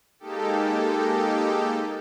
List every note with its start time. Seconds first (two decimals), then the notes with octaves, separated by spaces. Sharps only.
0.19 G#3 A#3 D#4 G4 A4